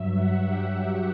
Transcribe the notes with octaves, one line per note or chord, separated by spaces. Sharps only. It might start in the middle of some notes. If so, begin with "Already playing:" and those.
Already playing: G2 F#3 E5
F#5
G4
G4